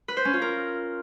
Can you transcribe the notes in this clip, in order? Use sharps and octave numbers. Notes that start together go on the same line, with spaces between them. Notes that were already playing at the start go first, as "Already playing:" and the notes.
B4
C5
C#4
F4
A#4